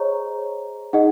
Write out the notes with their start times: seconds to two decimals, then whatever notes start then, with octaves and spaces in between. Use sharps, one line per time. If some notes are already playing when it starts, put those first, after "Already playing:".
Already playing: G#4 C5 C#5 D#5 A#5 C#6
0.93 D#4 G#4 D#5 F#5